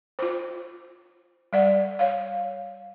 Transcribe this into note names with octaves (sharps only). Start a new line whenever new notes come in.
F4 C5
G3 D5 F#5
C#5 F5